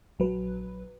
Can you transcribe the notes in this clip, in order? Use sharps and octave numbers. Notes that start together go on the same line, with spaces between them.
A#1 F#3 B4